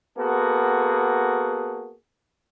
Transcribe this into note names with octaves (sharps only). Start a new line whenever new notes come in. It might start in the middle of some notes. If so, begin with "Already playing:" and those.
A#3 B3 F#4 G#4 A4